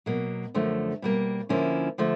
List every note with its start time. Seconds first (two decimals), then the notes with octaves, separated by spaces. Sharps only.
0.06 B2 F#3 A#3
0.54 F#2 D3 F3 A3
1.02 B2 G3 A#3
1.49 D3 F3 A#3 C#4 E4
1.98 D3 F3 A3